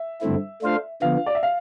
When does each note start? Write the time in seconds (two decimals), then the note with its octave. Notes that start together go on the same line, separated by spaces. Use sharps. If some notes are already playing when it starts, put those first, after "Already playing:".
Already playing: E5
0.21 G2 D3 A3 C4 E4
0.61 A3 D4 F4 C5 F5
1.02 D3 F3 B3 F5
1.26 D5
1.35 E5
1.43 F5